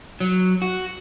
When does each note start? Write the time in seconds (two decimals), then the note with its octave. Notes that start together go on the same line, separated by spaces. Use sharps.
0.20 F#3
0.62 F#4